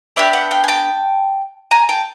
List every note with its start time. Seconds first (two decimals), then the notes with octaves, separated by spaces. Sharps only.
0.16 B3 D4 G4 D5 E5
0.33 E5 F#5
0.51 F5 G5
0.64 G#5
0.68 G5 A5
1.71 G#5 A#5
1.89 G5 A5